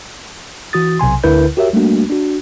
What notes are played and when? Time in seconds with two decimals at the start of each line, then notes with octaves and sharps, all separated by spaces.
0.73 E3 F#4 D#6 A6
0.99 B1 C3 G#5 C6
1.24 D2 D3 E4 A#4 B4 G6
1.57 F#4 G4 A#4 C#5 E5
1.73 G3 A3 A#3 D4 F#4
2.10 D4 F#4